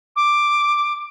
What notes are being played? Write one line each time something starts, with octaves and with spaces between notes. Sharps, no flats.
D6